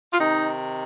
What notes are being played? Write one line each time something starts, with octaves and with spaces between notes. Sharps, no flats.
F4
C3 D#3 D#4